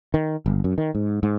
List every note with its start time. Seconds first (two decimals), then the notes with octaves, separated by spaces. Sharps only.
0.14 D#3
0.46 G1
0.64 F#2
0.78 D#3
0.95 G#2
1.23 G#2